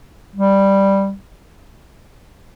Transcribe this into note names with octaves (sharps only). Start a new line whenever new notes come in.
G3